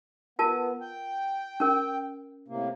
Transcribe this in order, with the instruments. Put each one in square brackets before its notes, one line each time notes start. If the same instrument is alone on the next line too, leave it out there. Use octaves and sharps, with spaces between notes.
[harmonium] B3 [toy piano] F4 A#4 A5
[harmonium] G5
[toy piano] C#4 A#4
[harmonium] A2 C3 A#3